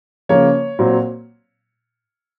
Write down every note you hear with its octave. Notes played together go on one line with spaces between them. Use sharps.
C#3 F3 A#3 C#5
A#2 F#3 C4